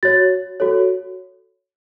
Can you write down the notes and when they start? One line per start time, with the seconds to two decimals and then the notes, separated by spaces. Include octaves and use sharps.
0.03 F#4 C#5 A6
0.60 F#4 A4 C#5